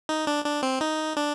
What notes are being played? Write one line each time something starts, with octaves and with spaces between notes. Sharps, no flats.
D#4
D4
D4
C4
D#4
D4